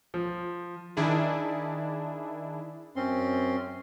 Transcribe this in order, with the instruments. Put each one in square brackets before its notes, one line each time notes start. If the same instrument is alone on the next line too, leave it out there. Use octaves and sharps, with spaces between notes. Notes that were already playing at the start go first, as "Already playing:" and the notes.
[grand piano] F3
[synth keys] D#3 D4 E4 G#4
[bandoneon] F#2 C4 C#4 C6